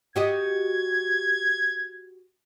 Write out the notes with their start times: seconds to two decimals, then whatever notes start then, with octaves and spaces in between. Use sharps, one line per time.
0.16 F#4 G4 D#5 G#6